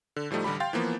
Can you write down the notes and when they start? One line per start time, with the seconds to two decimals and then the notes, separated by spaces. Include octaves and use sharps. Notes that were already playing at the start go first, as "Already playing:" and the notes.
0.16 D3
0.31 A2 F3 G3 A3 D#4
0.44 A1 D3 G3 G4 B5
0.60 F5 G5 C6 G6 A6
0.73 E3 F3 A#3 B3